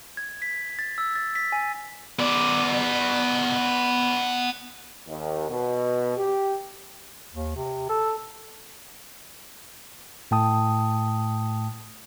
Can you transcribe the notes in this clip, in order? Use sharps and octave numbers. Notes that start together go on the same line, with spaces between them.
G#6
B6
A6
E6
A6
B6
G#5
B3 D5
D#2
B2
G4
D#2
C3
A4
A2 A3 G5 A5 D#6